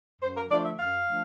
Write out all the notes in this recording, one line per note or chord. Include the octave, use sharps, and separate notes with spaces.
F#2 C5
A#4
D3 F3 A3 D5
E5
F#2 F5
D3 F3 A3